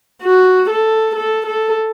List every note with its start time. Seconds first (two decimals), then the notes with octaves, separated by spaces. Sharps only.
0.23 F#4
0.70 A4
1.16 A4
1.47 A4